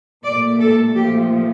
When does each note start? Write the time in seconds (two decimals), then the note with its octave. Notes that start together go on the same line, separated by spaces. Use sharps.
0.23 A#2 A3 D5
0.60 A4
0.95 A#2 F3 A3 G4